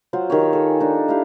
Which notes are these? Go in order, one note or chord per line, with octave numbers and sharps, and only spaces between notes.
F#3 F4 C5
D#3 G4 C#5
A4 G#5
D4 D#4
E4 G4 F5